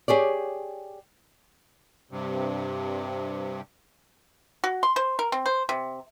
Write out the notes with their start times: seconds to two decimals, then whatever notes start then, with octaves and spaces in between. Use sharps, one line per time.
0.08 G4 G#4 C#5 D5
2.11 G2 C3
4.64 F#4
4.83 C6
4.96 C5
5.19 A#4
5.32 C4
5.46 C5
5.69 C3